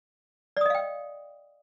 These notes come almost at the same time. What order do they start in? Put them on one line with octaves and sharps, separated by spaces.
D5 D#6 D#5 F5 G5